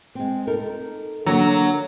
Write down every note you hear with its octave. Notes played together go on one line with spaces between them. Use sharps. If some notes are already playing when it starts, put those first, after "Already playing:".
G#3 C4
D#4 A4 A#4
D3 F#3 A#3 D4